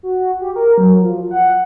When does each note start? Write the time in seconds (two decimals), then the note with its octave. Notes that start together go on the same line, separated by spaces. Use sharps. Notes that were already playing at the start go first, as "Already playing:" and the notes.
0.03 F#4
0.41 G4
0.56 A#4
0.78 F#3
1.02 F3
1.31 F#5